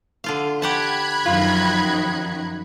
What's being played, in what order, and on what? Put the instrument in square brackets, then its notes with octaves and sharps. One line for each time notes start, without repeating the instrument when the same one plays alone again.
[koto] D3 F4 F5
[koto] G4 F#5 A5 [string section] B5 F#6 G#6
[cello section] F#2 D#3 F3 [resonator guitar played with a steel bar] F4